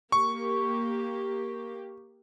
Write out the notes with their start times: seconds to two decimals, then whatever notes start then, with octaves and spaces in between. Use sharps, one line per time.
0.12 A#3 G4 C#6